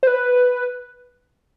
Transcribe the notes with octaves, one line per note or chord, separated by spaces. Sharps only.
C5
B4